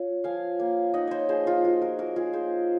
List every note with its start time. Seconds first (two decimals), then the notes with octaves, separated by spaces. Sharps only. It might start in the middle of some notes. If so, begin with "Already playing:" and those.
Already playing: F4 C#5
0.24 F3 F5 G#5
0.59 A#3
0.94 D#4 D#5 F#5
1.07 C5 C#5 D#5
1.29 F3 G#4 C5
1.46 F4 G#4
1.64 F3 F#4
1.82 F#4 A#4
1.99 A#3 F#4 A#4
2.16 F4 G#4
2.33 F4 G#4 C5